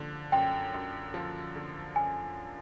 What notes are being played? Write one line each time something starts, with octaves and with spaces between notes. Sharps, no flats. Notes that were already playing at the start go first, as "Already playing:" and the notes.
Already playing: D3 F3
F#2 G5
F#2
F3
D3
F#2 G#5